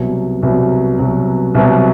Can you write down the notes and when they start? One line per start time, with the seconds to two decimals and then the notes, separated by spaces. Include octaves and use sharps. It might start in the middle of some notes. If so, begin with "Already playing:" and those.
Already playing: C2 B2 F#3
0.43 C2 B2 F#3
0.99 C2 B2 F#3
1.55 C2 B2 F#3